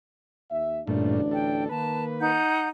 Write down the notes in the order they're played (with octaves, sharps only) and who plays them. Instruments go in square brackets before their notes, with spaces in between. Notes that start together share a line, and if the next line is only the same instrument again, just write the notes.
[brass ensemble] D#2 E5
[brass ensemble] A1 D2 D4 [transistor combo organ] G2 A#2 A3
[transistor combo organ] A4 [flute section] G5
[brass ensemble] D#3 A#3 [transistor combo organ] B4 [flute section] A5
[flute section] D#4 F#5 G6